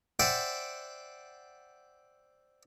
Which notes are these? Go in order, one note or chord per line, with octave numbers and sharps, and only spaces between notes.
C5 D5 E5 F#5 G5